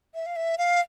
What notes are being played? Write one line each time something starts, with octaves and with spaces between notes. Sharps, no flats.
E5
F5
E5
F5